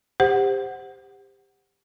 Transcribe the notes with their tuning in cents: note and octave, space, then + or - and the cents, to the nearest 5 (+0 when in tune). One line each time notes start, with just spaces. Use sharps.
G4 +25 C5 +0 F#5 +0